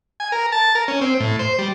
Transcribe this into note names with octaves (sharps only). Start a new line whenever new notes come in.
G#5
A#4
A5
A#4
C#4
C4
A2
C5
G3